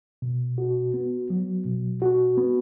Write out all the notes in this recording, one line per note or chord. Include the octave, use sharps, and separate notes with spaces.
B2
F#4
B3
F#3
B2
F#4
B3